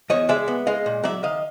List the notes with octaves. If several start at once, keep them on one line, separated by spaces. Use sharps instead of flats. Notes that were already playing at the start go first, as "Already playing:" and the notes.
E2 C#5 D#5
G#3 D5 E5
B3
G#3 D#5 F5
A#2
F#3 D5 E5
D#3 D#5 F5